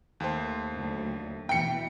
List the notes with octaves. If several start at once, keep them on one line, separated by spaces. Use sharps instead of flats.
D#2 A3 C5
D2 F#3
B2 E3 G5 C#7